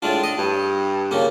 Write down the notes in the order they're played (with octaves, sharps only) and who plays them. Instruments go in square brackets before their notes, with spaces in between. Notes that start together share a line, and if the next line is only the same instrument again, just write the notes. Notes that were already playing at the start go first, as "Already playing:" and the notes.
[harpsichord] A2 G#3 F4 [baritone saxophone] D4
[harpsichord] D#5
[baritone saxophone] G2
[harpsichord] A#2 C#3 A#3